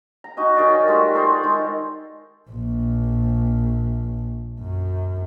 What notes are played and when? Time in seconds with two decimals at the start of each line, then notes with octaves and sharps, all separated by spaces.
0.24 A#5
0.37 D#4 F#4 D#5 G#5
0.56 D#3 F#3 G#4 D5
0.87 G3 A3 F4 F#4
1.14 G#4 A4 C5 D5
1.43 D#3 G#3
2.50 A#1
4.60 F#2